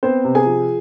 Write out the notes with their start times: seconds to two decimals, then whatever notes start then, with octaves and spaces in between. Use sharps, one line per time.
0.03 B3 C4 C5
0.25 C3
0.35 G#4 G#5
0.45 F3